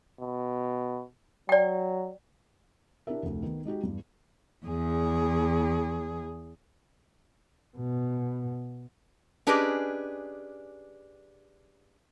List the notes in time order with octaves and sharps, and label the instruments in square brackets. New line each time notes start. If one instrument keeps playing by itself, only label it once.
[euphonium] B2
[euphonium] F#3 [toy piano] D5 G5
[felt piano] D4 E4 G4 A#4 E5
F1 D2
D#3 B3
G#3 D#4 F#4 G4
E2 G2
[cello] E2 G#4
[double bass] B2
[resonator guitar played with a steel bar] C#4 D4 G4 G#4 B4 D#5